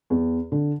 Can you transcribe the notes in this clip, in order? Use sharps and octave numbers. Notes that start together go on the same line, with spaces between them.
E2
D3